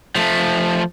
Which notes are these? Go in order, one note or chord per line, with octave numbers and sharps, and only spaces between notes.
F3 A3